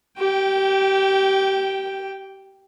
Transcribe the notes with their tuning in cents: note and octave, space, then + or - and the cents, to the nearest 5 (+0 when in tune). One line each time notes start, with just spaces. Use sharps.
G4 -25 G5 +0